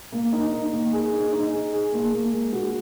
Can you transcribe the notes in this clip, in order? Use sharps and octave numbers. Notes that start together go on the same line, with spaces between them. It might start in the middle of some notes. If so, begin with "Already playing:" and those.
A#3
D#4
D#4
A#3
G#4
D#4
D#4
G#4
G#4
A#3
A#3
G#3
F#4